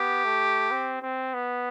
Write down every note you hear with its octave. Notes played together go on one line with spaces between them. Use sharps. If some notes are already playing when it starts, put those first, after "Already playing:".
Already playing: B3 G4
A3
C4
C4
B3